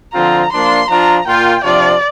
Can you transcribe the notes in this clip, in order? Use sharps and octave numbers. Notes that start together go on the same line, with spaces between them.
D3 F3 C4 F4 A#5
F3 A#3 D4 C6
F3 D4 F4 A#5
A#2 A#3 F4 G5
C3 F3 D4 F4 D5